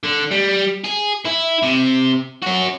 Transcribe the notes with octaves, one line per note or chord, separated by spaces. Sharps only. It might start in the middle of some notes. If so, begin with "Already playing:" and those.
D3
G3
G#4
E4
C3
C#4 F#4